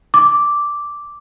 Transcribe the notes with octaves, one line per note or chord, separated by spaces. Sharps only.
D6